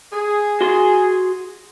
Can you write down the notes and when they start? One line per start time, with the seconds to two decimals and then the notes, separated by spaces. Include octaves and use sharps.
0.13 G#4
0.61 F#4 C6